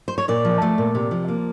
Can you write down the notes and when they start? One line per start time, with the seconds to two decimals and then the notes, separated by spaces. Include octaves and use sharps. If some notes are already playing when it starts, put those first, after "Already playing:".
0.08 C5
0.18 C#5
0.28 A#2 D5
0.45 F3
0.62 A3
0.78 A#2
0.95 C3
1.11 F3
1.28 A#3